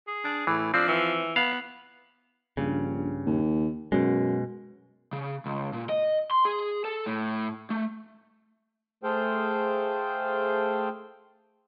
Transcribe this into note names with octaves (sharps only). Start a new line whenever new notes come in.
G#4
D4
A2 E3
F3 C4 D4
E3
B3 F5
A#1 G2 C#3
D#2
F#2 B2 G#3
C#3
C#2
A#2
D#5
C6
G#4
A4
A2
A3
A3 G#4 A4 C5 F5 G5